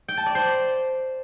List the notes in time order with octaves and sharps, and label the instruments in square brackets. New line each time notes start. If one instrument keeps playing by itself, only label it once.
[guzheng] G5
A5
D5
C5